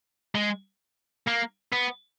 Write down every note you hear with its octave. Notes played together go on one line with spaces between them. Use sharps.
G#3
A#3
B3